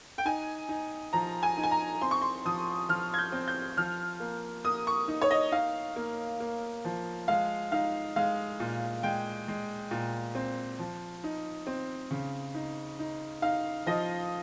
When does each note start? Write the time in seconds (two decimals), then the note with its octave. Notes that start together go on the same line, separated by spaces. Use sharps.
0.18 G5
0.25 D#4 G#5
0.69 D#4
1.13 F3 A#5
1.43 G#5
1.57 D#4
1.63 G#5
1.71 A#5
2.01 C4 C6
2.11 C#6
2.21 C6
2.45 F3 D#6
2.89 F3 F6
3.14 G#6
3.18 G6
3.32 C4
3.48 G6
3.77 F3 F6
4.20 A#3
4.64 A#3 D#6
4.87 C#6
5.08 D#4
5.21 C#5
5.31 D#5
5.52 D#4 F5
5.96 A#3
6.40 A#3
6.85 F3
7.28 G#3 F5
7.72 D#4 F5
8.16 G#3 F5
8.60 A#2
9.03 G#3 G5
9.48 G#3
9.91 A#2
10.35 C4
10.79 F3
11.24 D#4
11.67 C4
12.11 C#3
12.55 D#4
12.99 D#4
13.42 D#4 F5
13.86 F3 D#5